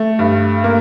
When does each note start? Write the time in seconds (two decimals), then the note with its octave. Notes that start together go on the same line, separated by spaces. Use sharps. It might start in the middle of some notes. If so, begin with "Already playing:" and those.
Already playing: A3
0.19 G2
0.64 A#3